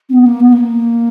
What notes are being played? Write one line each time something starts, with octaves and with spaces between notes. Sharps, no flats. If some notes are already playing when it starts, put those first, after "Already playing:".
C4
B3
A#3
B3
A#3